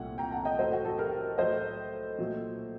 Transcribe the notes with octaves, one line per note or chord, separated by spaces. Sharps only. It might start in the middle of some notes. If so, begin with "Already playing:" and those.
Already playing: C2 A#2 A3 F#5
G5 A#5
F#5 A5
D#5 G5
A2 F#3 A3 C5 D#5
F#4
F#4 A4
G4 A#4
A2 F#3 A3 C5 D#5
A#2 F#3 A3